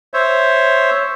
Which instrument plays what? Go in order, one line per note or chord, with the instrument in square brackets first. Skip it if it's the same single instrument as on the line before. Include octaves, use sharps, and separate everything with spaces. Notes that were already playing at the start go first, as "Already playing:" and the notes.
[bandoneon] C5 C#5 E5